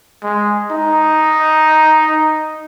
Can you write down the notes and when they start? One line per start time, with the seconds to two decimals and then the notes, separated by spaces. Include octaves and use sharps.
0.23 G#3
0.71 D#4